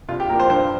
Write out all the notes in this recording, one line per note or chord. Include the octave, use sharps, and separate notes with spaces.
C2 F4
G4
A#2 F3 A#3 A#4
C5
G2 C5